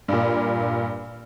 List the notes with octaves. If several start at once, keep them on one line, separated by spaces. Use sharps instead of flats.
G2 A#2